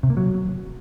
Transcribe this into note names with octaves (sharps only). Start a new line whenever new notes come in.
C3
A#3
F#3